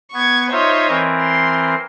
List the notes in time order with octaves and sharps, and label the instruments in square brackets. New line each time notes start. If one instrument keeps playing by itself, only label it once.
[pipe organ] B3 [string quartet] C#6 G#6
[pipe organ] D#4 F4 E5 [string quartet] C5 C#5 D#5
[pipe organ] E3 C4 A#4
[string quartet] C6